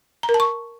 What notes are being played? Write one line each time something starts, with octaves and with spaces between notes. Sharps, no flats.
A#5
A#4
A5
C#6